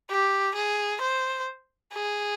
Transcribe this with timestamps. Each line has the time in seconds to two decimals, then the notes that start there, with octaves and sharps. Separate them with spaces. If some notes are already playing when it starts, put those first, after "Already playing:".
0.10 G4
0.55 G#4
1.02 C5
1.93 G#4